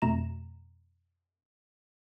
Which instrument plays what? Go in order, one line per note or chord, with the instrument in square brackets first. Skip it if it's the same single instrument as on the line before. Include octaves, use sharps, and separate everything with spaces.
[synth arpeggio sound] F2 B2 A3 A#5 A#6 E7